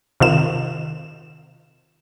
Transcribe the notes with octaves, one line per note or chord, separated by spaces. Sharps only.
C3 D#3 F4 E7